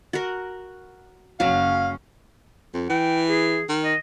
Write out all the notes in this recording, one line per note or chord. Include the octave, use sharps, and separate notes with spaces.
F#4 A#4
F#1 F#3 C#4 F#4 F5
F2
E3 G5
G#4
D#3
D#5